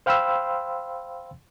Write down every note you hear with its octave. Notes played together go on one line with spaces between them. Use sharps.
C5 F5 G5 B5 C6 E6